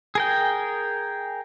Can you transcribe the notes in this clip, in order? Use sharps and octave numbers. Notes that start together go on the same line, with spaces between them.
G#4 A#4 G5